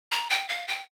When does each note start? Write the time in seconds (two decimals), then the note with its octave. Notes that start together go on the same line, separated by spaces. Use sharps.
0.12 A#5
0.30 G5
0.49 F5
0.68 G5